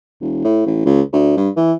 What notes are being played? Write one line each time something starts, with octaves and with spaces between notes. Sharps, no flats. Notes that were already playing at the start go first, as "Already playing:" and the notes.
E1
A2
A1
C#2
D2
G2
E3